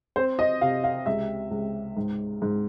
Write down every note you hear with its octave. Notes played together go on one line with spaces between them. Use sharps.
C4 C5
D#5
C3 F5
F5
C#2 E5
C#2
G#2
G#2